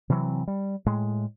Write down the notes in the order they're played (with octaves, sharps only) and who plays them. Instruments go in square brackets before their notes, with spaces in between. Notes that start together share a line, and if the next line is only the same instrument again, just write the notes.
[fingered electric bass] C3 E3 F#3 C4
G3
A2 G#3